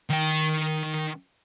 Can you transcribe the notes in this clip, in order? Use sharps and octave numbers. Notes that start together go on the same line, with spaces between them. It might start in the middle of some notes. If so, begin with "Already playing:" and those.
D#3 G5